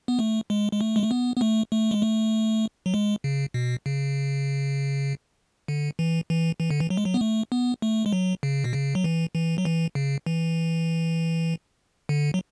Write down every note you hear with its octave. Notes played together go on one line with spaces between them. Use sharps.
B3
A3
G#3
G#3
A3
G#3
A3
B3
B3
A3
A3
G#3
A3
F#3
G#3
C#3
B2
C#3
D3
E3
E3
E3
D3
E3
F#3
G#3
F#3
B3
A3
B3
A3
G#3
F#3
C#3
B2
C#3
F#3
E3
E3
F#3
E3
C#3
E3
D3
F#3